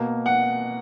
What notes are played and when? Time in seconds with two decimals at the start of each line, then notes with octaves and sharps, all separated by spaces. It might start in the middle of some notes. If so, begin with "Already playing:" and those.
Already playing: B2 A#3
0.26 F#5